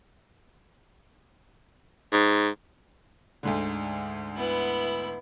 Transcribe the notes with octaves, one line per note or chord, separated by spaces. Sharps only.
G#2
D2 G#2 D3
B3 E4